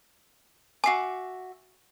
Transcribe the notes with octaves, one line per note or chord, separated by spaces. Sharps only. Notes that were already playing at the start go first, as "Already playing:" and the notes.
F#4 E5 G#5 D6 C7